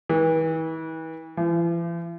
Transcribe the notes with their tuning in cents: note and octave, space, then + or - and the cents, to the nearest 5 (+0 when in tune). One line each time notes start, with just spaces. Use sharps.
E3 -40
E3 +45